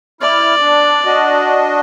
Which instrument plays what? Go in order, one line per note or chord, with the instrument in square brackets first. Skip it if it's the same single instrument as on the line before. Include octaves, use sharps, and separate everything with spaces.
[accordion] E4 F6 [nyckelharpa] D5
[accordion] D4
D4 F#4 D#5